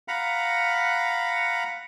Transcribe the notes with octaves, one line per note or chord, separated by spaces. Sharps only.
F5 F#5 A#5 B5